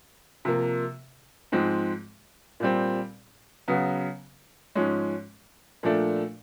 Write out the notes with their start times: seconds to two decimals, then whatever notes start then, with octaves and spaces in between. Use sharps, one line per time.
0.45 C3 F3 A#3
1.52 G#2 F3 G#3 C4
2.60 A#2 G3 C4
3.68 C#3 F#3 B3
4.75 G#2 F3 G#3 C#4
5.83 A#2 F3 A3 D4